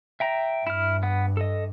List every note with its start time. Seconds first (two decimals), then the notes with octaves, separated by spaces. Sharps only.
0.20 E5 G5 A#5
0.67 G2 E4 F6
1.03 B3 F#5
1.37 A4 D#5